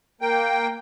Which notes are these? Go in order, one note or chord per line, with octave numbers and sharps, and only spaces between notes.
A#3 G5